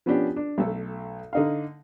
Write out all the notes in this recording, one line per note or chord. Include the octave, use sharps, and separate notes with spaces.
F3 B3 C#4 D4 G4
D4
B1 A3 A4
D3 D#4 F5